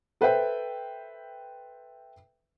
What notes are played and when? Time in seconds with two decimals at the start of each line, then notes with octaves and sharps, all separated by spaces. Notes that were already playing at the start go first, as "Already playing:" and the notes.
0.21 A4 B4 C5 E5 G5